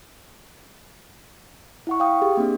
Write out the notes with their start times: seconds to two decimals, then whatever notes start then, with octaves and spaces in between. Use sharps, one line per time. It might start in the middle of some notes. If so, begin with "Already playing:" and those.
1.87 E4 F#5 C#6
2.00 F5 G5 D#6
2.22 G4 G#4
2.37 A#3 C4 D4